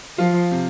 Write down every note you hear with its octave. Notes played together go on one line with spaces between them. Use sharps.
F3 F4
C3